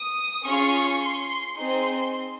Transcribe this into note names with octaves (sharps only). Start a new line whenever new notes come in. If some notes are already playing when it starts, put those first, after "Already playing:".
Already playing: D#6
C#4 F4 G#4 C#6
C6
C4 D#4 G#4 C6